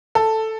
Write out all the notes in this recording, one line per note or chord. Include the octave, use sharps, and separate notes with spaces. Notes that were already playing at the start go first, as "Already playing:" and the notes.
A4